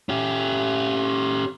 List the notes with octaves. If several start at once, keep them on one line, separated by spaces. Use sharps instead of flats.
C#4 G4